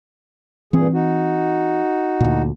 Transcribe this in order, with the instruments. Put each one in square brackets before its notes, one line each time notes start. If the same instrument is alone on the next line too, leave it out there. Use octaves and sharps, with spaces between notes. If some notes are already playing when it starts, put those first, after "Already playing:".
[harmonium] G2 A#2 G#4 [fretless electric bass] E3 C4
[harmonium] D#4 F#4
[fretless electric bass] D2 A#2